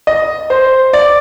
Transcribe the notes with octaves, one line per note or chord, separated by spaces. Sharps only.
D#5
C5
D5